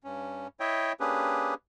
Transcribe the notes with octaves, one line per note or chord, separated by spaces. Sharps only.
G2 C#4
E4 C#5 D#5 E5 G5
A#3 C#4 D4 G4 G#4 B4